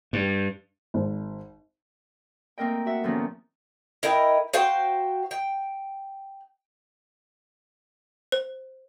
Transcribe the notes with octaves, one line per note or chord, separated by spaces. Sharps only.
G2
G#1
A3 A#3 C4 A#4 D#5 G5
F#4 E5 F#5
E2 A2 D#3 F3 A#3 C#4
E4 A#4 D#5 G5
F#4 C5 F5 G5
G5
C5